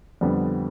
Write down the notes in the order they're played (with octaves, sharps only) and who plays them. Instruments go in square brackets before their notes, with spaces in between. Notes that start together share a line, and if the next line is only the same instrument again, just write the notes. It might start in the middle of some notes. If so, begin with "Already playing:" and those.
[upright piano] F2 D3 G3 B3